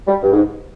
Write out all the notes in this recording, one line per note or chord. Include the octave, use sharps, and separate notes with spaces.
G3
G2
G#2